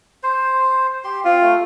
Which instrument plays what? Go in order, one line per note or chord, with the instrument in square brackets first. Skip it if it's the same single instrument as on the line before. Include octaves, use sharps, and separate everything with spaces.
[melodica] C5
G4 C6
[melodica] C4 [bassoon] F4
[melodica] A3